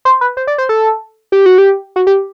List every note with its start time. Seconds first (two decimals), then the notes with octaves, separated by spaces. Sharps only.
0.05 C5
0.21 B4
0.37 C5
0.47 D5
0.58 C5
0.69 A4
1.32 G4
1.46 F#4
1.58 G4
1.96 F#4
2.07 G4